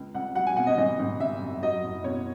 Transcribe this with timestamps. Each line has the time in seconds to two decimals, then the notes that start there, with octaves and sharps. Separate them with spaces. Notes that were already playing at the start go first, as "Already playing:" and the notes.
Already playing: C#2
0.14 C#2 F#5
0.35 F#3 F#5
0.47 G#5
0.56 B2 F#5
0.67 D#5
0.77 G#1 D#5
0.99 G#1
1.20 C#3 E5
1.41 F#2
1.63 F#3 D#5
1.84 F#1
2.04 B2 C#5